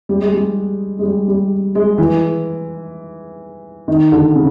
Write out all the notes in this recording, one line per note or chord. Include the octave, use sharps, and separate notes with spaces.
G3
G#3
G3
G#3
G3
G3
G#3
E3
D#3
D3
C#3